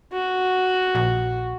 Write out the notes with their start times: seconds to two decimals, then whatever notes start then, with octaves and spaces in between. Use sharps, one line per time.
0.13 F#4
0.95 A#1